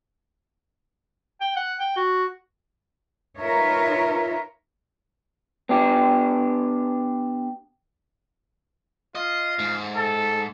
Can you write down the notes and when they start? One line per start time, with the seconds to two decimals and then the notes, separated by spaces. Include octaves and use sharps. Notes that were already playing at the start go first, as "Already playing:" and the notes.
1.41 G5
1.56 F#5
1.80 G5
1.96 F#4
3.38 D#4 F4 A#4 B4 C#5 E5
5.69 B3 D4 G4
9.15 F4 D#5
9.59 G#2
9.95 A4